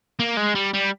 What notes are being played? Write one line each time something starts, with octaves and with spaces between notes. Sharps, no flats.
A#3
G#3
G3
G3